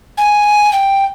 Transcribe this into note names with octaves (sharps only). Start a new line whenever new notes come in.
G#5
G5